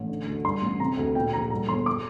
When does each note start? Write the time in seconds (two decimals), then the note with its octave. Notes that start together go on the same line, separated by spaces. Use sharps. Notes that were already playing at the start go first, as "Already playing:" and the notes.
Already playing: A1
0.09 D3
0.27 D2
0.45 G2 C6
0.62 A1
0.80 C3 A#5
0.97 D2
1.15 A#2 G5
1.33 A#1 A#5
1.51 G2 A#5
1.69 G1 C6
1.86 D6